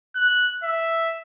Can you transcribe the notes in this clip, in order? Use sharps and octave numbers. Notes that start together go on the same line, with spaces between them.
F#6
E5